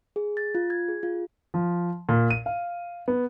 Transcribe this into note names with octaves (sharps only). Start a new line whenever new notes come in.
G#4
A6
F4
G#6
G#4
F4
F3
A#2
D#7
F5
B3